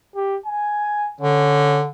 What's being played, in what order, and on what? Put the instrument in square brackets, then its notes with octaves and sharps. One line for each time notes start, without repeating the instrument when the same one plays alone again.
[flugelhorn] G4
G#5
[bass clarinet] D3 [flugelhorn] C#4